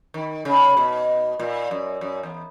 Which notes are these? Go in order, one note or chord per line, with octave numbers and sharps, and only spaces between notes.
D#3
C#3
B2
A#2
F#2
F#2
E2